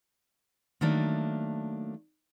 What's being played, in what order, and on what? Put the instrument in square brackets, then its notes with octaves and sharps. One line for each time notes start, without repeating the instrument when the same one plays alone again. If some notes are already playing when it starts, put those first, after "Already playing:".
[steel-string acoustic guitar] D#3 F#3 A3 A#3 D4